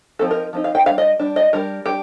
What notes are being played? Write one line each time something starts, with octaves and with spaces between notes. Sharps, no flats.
F3 C4 D#4 A4
A#4
F3 C4 D#4
F5
G5
G3 D4 F5
D#5
G3 D4
D#5
G3 D4 A#4
G3 D4 G4